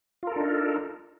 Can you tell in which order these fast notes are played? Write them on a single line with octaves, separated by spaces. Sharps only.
F4 A#4 A4 D4 D#4